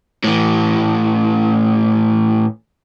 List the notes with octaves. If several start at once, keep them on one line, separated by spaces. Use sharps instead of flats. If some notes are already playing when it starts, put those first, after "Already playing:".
A2 E3